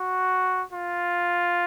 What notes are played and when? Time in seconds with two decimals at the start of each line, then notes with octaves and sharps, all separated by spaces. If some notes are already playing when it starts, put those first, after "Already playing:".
Already playing: F#4
0.73 F4